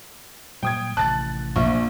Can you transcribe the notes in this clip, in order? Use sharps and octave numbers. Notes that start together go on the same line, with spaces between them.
A#2 F#3 G3 G5 D#6 G#6
A1 C3 D#3 A5 F#6 A6
A#1 A#3 C#6